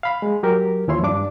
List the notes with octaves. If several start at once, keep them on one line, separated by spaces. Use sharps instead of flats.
F5 B5
G#3
F#3 G4 A#4
D#2 E3 F3 E4 C#5 C6
G2 D4 D6